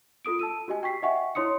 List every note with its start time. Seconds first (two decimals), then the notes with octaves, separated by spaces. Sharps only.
0.25 F4 A4 D#6 D7
0.39 A5 E6 D#7
0.68 F#4 G4 D#5 G#5
0.83 G5 C#6 B6 C7
1.03 D#5 E5 F#5 G#5 C#6
1.35 E4 C#5 C6 D#6 C#7